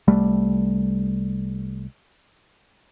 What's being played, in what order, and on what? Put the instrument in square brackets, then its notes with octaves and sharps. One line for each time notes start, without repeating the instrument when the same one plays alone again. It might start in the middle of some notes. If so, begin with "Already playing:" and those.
[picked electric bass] C2 G3 A3